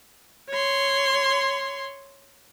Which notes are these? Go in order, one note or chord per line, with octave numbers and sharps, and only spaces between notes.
C#5 C6